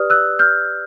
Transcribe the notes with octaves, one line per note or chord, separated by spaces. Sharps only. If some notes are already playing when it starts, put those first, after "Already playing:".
Already playing: G4 B4 D5 D#6 F6
E6 F#6
F6 G6